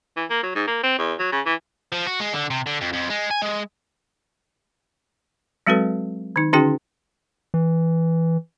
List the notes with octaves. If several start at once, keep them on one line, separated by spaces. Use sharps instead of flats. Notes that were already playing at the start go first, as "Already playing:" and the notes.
E3
A#3
F#3
G#2
A#3
C4
E2
F#3
C#3
E3
F3
F#4
G#3
D3
C3
D3
F2
F2
G#3
G#5
G#3
F#3 G#3 C4 F#4 A4 B4
D#3 D#4
D3 C#4 D#4 F#4 G#4 G5
E3